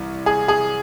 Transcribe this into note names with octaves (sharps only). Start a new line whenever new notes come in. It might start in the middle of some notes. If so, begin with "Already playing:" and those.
Already playing: C2 E3
G#4
G#4